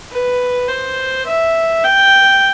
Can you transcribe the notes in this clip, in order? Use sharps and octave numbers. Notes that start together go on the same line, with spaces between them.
B4
C5
E5
G5